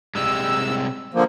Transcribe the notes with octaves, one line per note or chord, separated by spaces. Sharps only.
C3 G3 G#3 E6
D3 F3 A#3